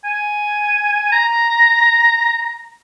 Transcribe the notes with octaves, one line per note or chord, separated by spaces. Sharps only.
G#5
A#5